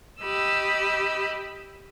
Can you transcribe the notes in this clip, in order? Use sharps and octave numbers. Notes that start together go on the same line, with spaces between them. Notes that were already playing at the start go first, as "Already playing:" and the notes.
G4 D#5 B5 E6